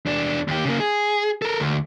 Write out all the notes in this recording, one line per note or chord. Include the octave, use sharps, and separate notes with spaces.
E2 D4
D#2 G4
C#3 A#3
G#4
A4 A#4
D2